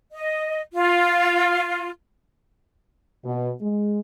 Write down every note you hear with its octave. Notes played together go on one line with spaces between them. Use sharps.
D#5
F4
B2
G#3